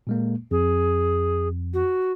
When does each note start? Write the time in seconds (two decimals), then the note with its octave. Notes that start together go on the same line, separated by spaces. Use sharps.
0.07 A#2 G#3 A#3
0.51 F2 G#4
1.74 F#4